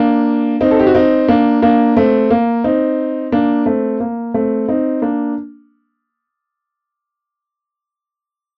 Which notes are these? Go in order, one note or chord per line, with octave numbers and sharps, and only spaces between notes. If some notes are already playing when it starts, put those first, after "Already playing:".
Already playing: A#3 D4
C4 D#4
A4
G4
F#4
C4 D#4
A#3 D4
A#3 D4
A3 C4
A#3
C4 D#4
A#3 D4
A3 C4
A#3
A3 C4
C4 D#4
A#3 D4